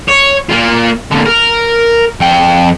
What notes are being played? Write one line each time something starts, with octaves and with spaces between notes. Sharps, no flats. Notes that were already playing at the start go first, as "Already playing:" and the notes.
C#5
A#3 F4
A#2 D3
A#4
F2 G5